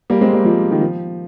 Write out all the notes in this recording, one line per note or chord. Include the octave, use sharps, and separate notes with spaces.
G3 A#3
G#3 C4
G3 A#3
F3 G#3
D#3
F3